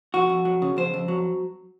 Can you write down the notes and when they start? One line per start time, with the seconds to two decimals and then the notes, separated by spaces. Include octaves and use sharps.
0.14 F2 F#4
0.29 F2
0.45 F#3
0.62 C#3
0.77 F2 C5
0.94 F2
1.08 F#3